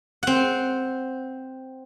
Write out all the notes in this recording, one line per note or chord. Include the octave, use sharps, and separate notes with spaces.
C4 F#5